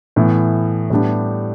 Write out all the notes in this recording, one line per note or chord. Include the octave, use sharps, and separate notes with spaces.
A2 E3 B3
A2 G3 B3 D4 G4